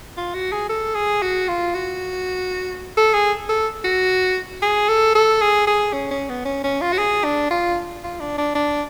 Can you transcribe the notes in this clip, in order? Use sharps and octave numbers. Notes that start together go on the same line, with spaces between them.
F4
F#4
G#4
A4
G#4
F#4
F4
F#4
A4
G#4
A4
F#4
G#4
A4
A4
G#4
G#4
C#4
C#4
B3
C#4
C#4
F4
F#4
G#4
D4
F4
F4
D4
D4
D4